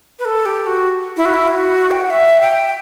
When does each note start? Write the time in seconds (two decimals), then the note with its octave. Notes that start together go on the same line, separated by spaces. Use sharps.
0.19 B4
0.25 A4
0.46 G4
0.66 F#4
1.17 E4
1.25 F#4
1.34 E4
1.48 F#4
1.91 G5
2.01 F#5
2.10 E5
2.41 G5